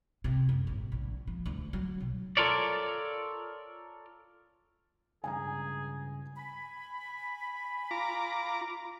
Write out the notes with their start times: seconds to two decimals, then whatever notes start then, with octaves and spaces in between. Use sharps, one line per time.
0.24 C3
0.49 F#2
0.67 A1
0.92 A#1
1.27 F3
1.46 D2
1.73 F#3
2.01 B1
2.37 F4 A4 A#4 C#5 D5
5.24 C#2 G2 G#4 G#5 A#5
6.37 G#5 B5
7.91 F4 A#5 D6